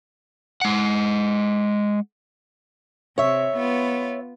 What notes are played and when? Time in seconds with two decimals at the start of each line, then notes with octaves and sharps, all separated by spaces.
0.61 G#3 F#5
3.18 C3 C#5 E5
3.57 B3 F4